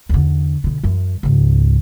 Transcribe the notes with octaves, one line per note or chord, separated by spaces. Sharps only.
E2 D3
B2 D3
F#2 E3
C#2 G#2